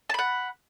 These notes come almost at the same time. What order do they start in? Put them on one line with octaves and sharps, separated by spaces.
A5 B5 F#5